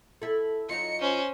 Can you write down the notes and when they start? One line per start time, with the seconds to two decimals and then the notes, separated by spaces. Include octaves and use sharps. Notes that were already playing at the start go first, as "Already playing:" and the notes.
0.22 E4 A4
0.69 F#3 D#4 F4 C#7
1.01 C#4 C5